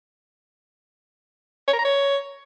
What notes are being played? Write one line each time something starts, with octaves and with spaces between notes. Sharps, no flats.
C#5
A#4
A#5
C#5